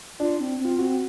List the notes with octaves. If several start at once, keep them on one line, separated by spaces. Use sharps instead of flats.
D4 F4
C4
C4
F4
C4 F#4